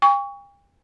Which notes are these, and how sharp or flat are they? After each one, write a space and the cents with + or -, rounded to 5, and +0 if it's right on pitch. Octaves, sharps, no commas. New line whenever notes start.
G5 +45 C#6 +25